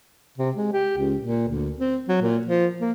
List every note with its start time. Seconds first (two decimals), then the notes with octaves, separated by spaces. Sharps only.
0.38 C3
0.56 G#3
0.73 G4
0.98 C#2
1.20 A#2
1.48 D2
1.79 C4
2.08 F#3
2.22 A#2
2.45 F3
2.81 A#3